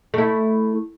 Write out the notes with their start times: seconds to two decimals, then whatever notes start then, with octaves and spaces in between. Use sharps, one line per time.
0.14 A3 E4